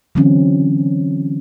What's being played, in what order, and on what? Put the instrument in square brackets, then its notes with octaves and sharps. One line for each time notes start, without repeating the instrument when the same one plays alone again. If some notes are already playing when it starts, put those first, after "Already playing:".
[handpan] D3 E3 F#3 C4 C#4